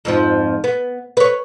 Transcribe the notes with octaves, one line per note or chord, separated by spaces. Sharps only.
F2 G#2 F3
B3
B4 C#5